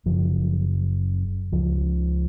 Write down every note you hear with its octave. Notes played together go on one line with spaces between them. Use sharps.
F#1 F#2 C#3 F3
C#2 C#3 F3